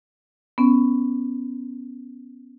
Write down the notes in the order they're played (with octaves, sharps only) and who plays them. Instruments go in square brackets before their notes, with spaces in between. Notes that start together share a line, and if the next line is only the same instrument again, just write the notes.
[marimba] B3 C#4